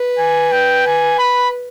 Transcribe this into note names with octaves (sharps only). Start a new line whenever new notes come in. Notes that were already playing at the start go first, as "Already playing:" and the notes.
Already playing: B4
G#5
G5
G#5
B5